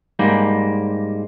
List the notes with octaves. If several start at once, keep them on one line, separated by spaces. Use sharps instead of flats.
G#2 G3 A#3